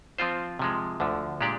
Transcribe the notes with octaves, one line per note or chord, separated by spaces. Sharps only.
F3 C4 F4 C5
C3 F3 G#3
D2 D3 F3
A#2 G#3 D4 G4 D5